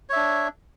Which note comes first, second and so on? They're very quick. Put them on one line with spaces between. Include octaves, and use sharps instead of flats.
C#5 E5 D4